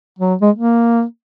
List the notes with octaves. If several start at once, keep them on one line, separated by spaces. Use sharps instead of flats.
F#3
G#3
A#3